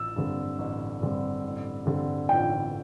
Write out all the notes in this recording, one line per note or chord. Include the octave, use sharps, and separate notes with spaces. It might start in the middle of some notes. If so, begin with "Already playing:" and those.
Already playing: A1 E6
G2 D3 G3 C4
A1
G2 D3 G3 C4
A1
G2 D3 G3 C4
A1 G5